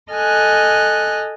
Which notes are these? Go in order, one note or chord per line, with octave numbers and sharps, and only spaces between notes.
A4 D#5 G#5 F6 F#6